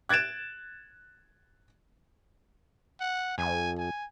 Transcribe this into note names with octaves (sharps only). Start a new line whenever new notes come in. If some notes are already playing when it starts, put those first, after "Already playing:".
F#6 G#6 A6 D7 E7
F#5
F2 G#5
G#5